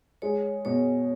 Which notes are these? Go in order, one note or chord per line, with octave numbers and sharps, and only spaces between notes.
G#3 C#5
B2 C#5